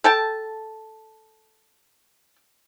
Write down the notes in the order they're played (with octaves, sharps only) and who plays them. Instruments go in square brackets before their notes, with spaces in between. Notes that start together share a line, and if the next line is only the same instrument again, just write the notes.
[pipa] A4 G5 A5